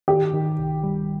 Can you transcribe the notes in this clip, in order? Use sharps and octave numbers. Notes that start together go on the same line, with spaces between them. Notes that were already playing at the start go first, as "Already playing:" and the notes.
D#3 G4
D#3
C2
G3